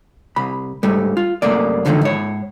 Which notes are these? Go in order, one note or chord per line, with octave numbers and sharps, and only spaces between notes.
C2 B5
G#2 G3 A3
F4
C2 F#2 A3 A#3 D5
E2 D3 D#3 F3 F#3 A3
G#2 C#5